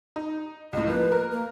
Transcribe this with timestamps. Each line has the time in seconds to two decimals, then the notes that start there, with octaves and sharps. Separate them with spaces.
0.16 D#4
0.73 C#2 A2 D#5
0.87 F3 A#3 B4
1.12 A#4
1.32 A#3